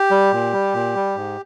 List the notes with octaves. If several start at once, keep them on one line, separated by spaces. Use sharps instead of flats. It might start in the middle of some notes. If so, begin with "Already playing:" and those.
Already playing: G4
G3
A#2
G3
A#2
G3
G#2